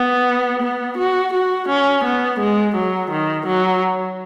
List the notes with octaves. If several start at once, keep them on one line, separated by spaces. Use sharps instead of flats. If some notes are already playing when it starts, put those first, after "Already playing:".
Already playing: B3
B3
F#4
F#4
C#4
B3
G#3
F#3
D#3
F#3